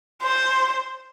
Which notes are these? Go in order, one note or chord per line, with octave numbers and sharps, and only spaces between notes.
C5